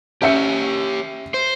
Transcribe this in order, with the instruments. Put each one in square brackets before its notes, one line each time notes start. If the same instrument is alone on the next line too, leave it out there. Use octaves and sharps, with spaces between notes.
[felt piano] C#4 E5 C#7 [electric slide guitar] G4 C#5
[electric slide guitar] C5